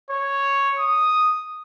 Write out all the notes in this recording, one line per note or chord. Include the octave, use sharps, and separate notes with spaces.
C#5
D#6